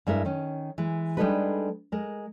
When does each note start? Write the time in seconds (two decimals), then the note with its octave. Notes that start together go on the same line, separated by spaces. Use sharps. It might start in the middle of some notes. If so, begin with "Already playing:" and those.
0.07 G2 G#3 E4 A#4 E5
0.25 D#3 C#4
0.78 E3 G#3
1.17 G3 G#3 D4 D#4 A4 B4
1.92 G#3 A#4